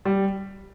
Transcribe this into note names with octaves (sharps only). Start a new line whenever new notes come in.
G3